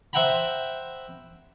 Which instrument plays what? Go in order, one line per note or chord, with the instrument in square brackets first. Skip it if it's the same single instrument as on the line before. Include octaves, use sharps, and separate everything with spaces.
[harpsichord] C5 E5 F#5 G5 A#5 B5